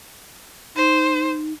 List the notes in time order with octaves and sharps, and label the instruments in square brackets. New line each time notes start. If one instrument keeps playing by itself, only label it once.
[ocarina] D#4 [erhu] C5